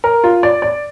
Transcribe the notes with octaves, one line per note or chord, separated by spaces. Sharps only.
A#4
F4
D5
D5